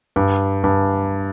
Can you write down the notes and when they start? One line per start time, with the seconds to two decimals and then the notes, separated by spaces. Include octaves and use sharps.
0.16 G2
0.64 G2